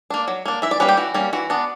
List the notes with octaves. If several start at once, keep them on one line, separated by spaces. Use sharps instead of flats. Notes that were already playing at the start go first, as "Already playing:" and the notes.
A#3 D4
F#3
A#3 D4
E3 E5
D5
G3 A#3 C#4 B4
G4
E3 F#4
G3 A#3 C#4
E3 F#4
B3 D4